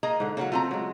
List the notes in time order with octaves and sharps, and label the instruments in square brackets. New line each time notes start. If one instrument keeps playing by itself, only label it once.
[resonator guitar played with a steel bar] A#3 D#5 A#5 [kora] G#4
[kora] G#2 D3
[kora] C#3 F#3 [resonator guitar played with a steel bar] A#3 C#5 F#5
[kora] F3 [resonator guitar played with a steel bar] A3 C4 A#5
[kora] F#3 G#3